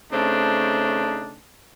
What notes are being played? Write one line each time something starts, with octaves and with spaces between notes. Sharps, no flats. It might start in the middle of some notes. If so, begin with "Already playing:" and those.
C#3 A3 C4 D4 D#4